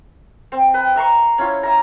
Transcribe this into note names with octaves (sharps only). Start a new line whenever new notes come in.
C4
B4 G5
E5 A#5 C6 C#6
C#4 E4 F4
E5 A#5